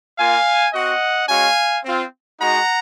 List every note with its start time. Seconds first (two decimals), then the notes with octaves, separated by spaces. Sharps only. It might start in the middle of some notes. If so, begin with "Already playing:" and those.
0.18 A#3 F4 F5 G#5
0.73 C4 F#4 D#5 F#5
1.28 G#3 C#4 F#4 F5 G#5
1.84 C4 F4
2.39 G#3 D#4 F#4 F#5 A#5